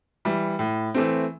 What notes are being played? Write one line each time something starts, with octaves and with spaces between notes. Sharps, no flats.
E3 G3
A2
E3 A3 C4